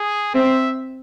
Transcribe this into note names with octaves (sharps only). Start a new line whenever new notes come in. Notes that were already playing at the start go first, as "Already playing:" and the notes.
Already playing: G#4
C4 E5